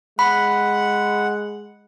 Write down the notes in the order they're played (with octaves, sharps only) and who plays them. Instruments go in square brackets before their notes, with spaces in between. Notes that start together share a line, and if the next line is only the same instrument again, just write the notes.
[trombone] G#3 [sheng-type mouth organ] F#5 [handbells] B5